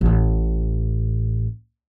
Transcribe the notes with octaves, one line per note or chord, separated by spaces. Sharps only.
A1 A2